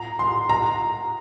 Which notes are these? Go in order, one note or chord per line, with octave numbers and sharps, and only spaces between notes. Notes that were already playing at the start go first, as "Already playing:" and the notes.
Already playing: A#5
C6
A#5